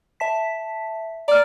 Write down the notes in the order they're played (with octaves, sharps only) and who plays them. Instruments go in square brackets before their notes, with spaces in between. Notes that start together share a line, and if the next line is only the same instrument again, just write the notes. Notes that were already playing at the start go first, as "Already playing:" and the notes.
[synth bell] E5 A5 B6
[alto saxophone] D5 [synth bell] A#5 F6